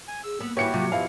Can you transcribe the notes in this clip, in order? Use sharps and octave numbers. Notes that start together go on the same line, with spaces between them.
G#5
G#4 E6
A#3 B3
E3 F#4 G4 B4 C#5 E5 C#7
C3 F#3 F4
F2 B2 F3 E4 G4 F5